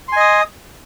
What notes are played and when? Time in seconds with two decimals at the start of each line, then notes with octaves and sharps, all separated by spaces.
0.08 C6
0.12 G#5
0.16 D#5
0.20 D#6